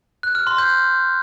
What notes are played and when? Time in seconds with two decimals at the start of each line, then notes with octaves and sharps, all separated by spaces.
0.23 F#6
0.35 F6
0.47 C6
0.58 G6